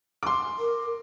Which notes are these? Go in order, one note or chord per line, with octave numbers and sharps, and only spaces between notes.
C6 D6
A#4